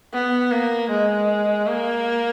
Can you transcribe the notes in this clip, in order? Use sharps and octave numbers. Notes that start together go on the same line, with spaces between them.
B3
A#3
G#3
A#3